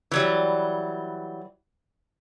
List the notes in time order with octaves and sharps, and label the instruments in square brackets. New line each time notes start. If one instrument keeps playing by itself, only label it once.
[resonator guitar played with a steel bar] E3 F#3 G3